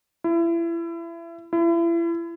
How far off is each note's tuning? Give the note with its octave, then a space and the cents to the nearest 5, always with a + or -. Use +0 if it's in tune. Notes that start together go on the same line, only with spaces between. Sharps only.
E4 +30
E4 +35